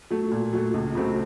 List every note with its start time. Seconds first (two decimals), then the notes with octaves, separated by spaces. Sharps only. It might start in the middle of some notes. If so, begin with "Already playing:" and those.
0.11 F#3 A3
0.32 A#2
0.53 F#3 A3
0.74 C#2
0.95 C#3 F#3 A3 C4